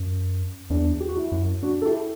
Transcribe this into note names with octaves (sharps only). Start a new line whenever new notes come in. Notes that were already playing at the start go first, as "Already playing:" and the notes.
Already playing: F#2
E2 D4
G4
F#4
E4
F#2
D4 F#4
A4
E4 G4